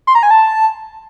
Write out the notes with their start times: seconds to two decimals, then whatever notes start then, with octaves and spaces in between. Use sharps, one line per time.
0.07 C6
0.15 A#5
0.23 G#5
0.31 A5